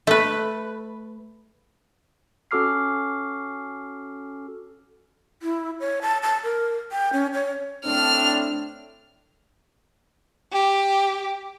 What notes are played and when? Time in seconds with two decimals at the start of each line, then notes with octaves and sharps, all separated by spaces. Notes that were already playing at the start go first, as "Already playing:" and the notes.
0.07 A3 B4
2.51 C#4 F#4 A4 D6 F6 C7
5.43 E4
5.80 C#5
6.02 A5
6.23 A5
6.44 A#4
6.92 G5
7.13 C#4
7.34 C#5
7.85 A2 C4 D4 F6
10.53 G4